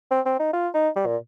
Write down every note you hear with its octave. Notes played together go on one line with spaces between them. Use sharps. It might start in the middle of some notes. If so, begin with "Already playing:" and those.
C4
C4
D#4
F4
D#4
G3
A#2